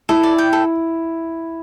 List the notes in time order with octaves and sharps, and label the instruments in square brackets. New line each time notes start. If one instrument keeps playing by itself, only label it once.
[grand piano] E4 [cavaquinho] A4
[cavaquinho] D5
G5
A4